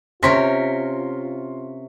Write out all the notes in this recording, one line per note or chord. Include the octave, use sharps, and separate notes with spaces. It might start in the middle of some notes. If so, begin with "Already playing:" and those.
C3 C#4 F4 A#4 C6 A#6 B6